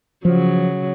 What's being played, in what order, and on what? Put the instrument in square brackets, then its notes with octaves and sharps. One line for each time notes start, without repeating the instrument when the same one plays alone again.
[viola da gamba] C#3 F#3 [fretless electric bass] F3